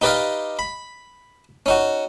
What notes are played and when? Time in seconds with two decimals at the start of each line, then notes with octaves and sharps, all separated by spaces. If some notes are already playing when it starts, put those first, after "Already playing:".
0.02 D#4 G4 B4 D5 D#5 F5
0.59 B5
1.66 C#4 D#4 F#4